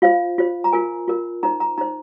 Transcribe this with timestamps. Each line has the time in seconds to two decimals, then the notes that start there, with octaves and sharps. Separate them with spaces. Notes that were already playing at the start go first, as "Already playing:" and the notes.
0.02 F4 C5 F5
0.38 F4 C5
0.64 A#5
0.72 F4 A#4 G#5
1.08 F4 A#4
1.43 D#4 C5 A#5
1.60 A#5
1.78 D#4 C5 A#5